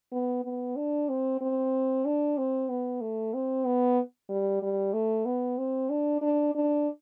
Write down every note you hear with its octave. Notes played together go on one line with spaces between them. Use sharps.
B3
B3
D4
C4
C4
D4
C4
B3
A3
C4
B3
G3
G3
A3
B3
C4
D4
D4
D4